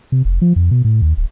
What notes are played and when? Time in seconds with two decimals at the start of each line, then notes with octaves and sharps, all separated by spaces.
0.12 C3
0.25 F1
0.42 F3
0.56 F2
0.71 B2
0.84 A2
1.02 D#2
1.17 D1